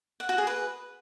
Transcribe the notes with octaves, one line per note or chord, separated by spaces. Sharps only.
F#5
F#4
G#4
B4